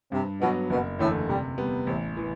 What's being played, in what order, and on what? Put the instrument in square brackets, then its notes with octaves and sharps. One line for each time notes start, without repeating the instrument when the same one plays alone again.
[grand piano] G2 [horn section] C3
[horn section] B2 [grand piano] F#3 B3
[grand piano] F#1 [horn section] B2
[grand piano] E2 D3 A3 [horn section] A2
[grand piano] C3 [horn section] G3
[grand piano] G3 B3
[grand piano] A1 [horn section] C3
[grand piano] E3